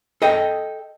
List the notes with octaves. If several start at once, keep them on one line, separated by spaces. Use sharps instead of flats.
A4 D#5 G5